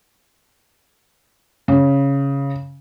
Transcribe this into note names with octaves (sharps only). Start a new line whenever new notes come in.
C#3